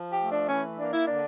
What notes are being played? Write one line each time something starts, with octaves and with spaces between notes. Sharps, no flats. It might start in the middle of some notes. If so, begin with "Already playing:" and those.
Already playing: F3
G4
A3
D4
E3 C#4
A#3 D4
E4
D3 D4